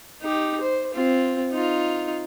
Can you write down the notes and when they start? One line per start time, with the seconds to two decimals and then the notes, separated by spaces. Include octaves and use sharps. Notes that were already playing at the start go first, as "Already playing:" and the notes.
0.22 D#4 G4
0.60 C5
0.94 C4 F4
1.52 D#4 F4